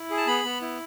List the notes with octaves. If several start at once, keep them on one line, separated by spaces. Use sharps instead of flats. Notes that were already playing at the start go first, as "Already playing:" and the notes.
Already playing: E4
G#4
A5
B3 B5
B3
E4